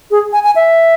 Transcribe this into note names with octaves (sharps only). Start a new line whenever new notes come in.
G#4
G#5
G#5
E5